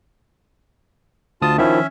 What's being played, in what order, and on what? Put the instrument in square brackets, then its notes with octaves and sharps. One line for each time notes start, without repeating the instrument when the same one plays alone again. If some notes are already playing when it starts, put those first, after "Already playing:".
[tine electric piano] D2 D#6 [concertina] F4 A5
[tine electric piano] D#3 F3 E4 [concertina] C#4 E5